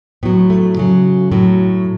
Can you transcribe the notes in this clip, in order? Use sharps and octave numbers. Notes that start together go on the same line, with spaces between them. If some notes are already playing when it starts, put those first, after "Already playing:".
A2 F#3 B3
A3
C#3 F#3
A2 F#3